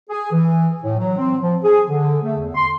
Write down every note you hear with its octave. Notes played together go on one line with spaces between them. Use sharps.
G#4
E3
A2
F#3
C4
F3
G#4
D3
A3
E2
C6